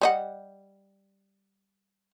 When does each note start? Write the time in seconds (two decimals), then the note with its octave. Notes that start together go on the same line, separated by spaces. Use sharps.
0.01 G3 D#5 F#5